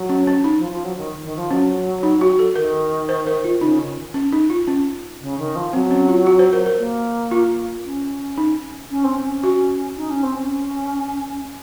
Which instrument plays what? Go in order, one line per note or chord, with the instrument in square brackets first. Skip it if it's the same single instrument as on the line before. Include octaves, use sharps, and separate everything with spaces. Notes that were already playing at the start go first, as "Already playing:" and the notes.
Already playing: [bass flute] F#3
[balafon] C#4
C#4
D#4
[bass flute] F3
F3
F#3
D#3
D#3
F3
[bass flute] F#3 [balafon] C#4
[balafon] D#4
F#4
A4
[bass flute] D#3 [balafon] A#4
[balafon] C5
A#4
F4
[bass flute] C#3 [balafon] D#4
[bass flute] D#3
[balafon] C#4
D#4
F4
C#4
[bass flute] C#3
D#3
F3
[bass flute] F#3 [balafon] C4
[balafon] C#4
F4
F#4
C5
A#4
A#4
[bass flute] A#3
[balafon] F4
[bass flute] C#4
[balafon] D#4
[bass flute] C#4
C4
C#4
[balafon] F#4
[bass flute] D#4
C#4
C4
C#4